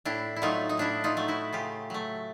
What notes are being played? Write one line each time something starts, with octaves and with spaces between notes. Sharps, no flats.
A2 D4 E4
E4
F#3 A3 D#4 F4
D#4
A2 D4 E4
D#4 F4
F#3 A3
E4 F#4
C#3 F4 G4
F#3 A3